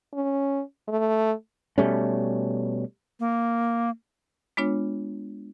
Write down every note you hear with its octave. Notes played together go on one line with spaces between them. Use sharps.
C#4
A3
B2 G3 A3 C#4
A#3
G#3 B3 D4 F4 C#5